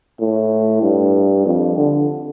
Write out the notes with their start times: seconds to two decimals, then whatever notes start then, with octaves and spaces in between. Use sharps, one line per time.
0.20 A2
0.82 G2
1.46 F2
1.77 D3